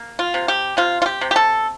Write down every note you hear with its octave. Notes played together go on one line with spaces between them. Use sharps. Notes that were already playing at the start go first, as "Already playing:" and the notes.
Already playing: A#3
F4
C3
G4
C3 F4
F4
G4
C3
G4
A4